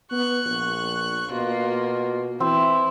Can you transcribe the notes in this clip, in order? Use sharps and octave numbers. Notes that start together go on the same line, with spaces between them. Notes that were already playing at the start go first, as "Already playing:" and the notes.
B3 C#6 F#6
A#1
B2 A#3 F4
E3 C4 E4